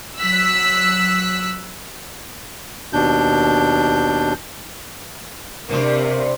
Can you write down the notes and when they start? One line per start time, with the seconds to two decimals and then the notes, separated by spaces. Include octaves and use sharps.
0.19 F#3 E6 F#6 B6
2.93 D#2 B2 D4 G6
5.69 G2 C3 C4 D4 A#4